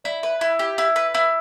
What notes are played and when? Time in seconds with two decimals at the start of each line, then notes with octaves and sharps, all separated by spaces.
0.04 E4 D5
0.23 B4 E5
0.41 E4 E5
0.59 G4
0.78 E4
0.96 B4
1.15 E4 E5